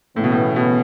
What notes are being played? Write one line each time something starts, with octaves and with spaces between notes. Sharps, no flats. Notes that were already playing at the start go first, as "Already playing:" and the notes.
A2 C#3 E3 B3
B2
A2
B2